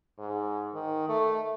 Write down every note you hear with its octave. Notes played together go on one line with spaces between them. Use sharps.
G#2
D#3
A3